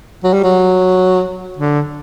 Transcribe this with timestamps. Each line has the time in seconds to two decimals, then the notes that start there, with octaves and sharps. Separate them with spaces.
0.24 F#3
0.34 G3
0.44 F#3
1.57 D3